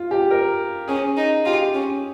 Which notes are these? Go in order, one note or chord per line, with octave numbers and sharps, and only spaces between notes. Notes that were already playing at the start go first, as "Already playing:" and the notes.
Already playing: F4
G4
A#4
C#4 G#4
D#4
F4 G4
C#4